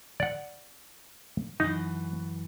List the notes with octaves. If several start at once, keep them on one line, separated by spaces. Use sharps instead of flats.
D5 F#5
F#2 E3 D#4